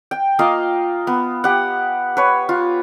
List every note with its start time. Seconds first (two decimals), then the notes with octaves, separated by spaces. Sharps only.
0.11 G5
0.39 A#3 F4 D#5 F5
1.07 B3
1.44 G4 F#5
2.17 B4 C#5
2.49 F4